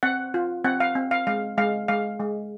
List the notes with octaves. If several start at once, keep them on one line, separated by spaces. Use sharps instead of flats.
C4 F#5
F4
C4 F#5
F5
C4
F5
G#3 F5
G#3 F5
G#3 F5
G#3